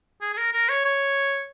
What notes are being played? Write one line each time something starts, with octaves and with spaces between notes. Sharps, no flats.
G#4
G#4
A#4
A#4
C#5
C#5